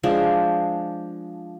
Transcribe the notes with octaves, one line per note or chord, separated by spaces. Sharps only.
F3 G#3 D4